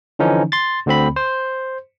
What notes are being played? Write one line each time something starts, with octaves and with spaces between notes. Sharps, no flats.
D3 E3 F3 C#4 D#4
C6 A6
D2 D3 C4 B5
C5